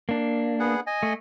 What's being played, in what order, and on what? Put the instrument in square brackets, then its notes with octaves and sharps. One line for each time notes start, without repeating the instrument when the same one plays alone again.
[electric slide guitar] A#3 D4
[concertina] B3 G#4 F#5
D#5 G#5
[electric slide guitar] A3